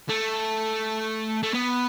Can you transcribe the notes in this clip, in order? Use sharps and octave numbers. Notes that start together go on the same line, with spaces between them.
A3
A3
B3